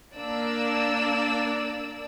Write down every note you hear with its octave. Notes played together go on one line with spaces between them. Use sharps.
A#3 D4 D5 E6